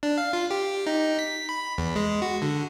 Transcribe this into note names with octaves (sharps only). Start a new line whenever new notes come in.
D4
F5
F4
G4
D#4
B6
B5
E2
G#3
F#4
D3